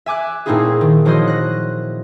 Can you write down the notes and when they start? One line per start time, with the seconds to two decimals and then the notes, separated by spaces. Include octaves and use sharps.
0.06 E5 G#5 D6 F#6
0.46 A#2 A3 C4 D#4 E4 G#4
0.81 D#3
1.05 F3 F#3 E4 F#4 C5 D#5
1.27 F#6 A#6